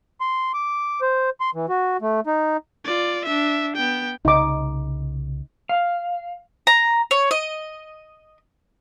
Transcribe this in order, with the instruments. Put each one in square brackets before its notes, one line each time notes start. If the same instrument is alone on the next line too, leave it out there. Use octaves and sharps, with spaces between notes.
[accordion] C6
D6
C5
C6
E3
F#4
A3
D#4
[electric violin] F4 D5
D4 E5
B3 G5
[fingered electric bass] C2 C#3 [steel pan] D#4 D6
[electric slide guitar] F5
[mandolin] A#5
C#5
D#5